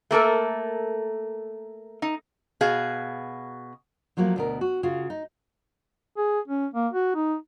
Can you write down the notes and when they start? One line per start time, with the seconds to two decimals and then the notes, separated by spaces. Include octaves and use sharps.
0.11 A3 A#3 A4 A#4
2.02 D#4
2.61 B2 F#4 G#4 F5
4.17 F3 F#3 A3 A#3
4.36 D2 B2 A#4
4.61 F#4
4.83 C#3 F4 F#4
5.10 D#4
6.17 G#4
6.48 C#4
6.74 A#3
6.93 F#4
7.15 D#4